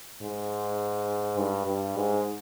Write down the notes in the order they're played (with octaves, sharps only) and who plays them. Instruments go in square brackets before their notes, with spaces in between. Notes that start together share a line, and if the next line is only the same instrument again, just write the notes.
[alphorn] G#2
G2
G2
G#2